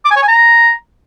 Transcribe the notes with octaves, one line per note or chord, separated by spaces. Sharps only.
D6
G#5
C#5
G#5
A#5